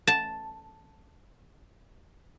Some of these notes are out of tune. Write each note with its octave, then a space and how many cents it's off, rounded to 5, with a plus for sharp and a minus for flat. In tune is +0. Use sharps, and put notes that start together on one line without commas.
A5 +0